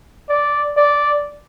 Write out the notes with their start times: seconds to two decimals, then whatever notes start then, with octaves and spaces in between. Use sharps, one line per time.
0.29 D5
0.77 D5